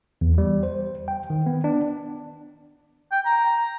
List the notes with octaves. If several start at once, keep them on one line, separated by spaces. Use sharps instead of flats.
E2
G3
C5
G5
D#3
B3
D4
G5
A#5